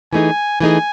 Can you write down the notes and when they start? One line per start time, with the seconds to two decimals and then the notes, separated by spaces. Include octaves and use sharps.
0.13 E3 A3 D#4 G#4 G#5
0.60 E3 A3 D#4 G#4 G#5